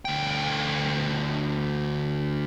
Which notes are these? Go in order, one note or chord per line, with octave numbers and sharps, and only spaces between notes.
D2 G5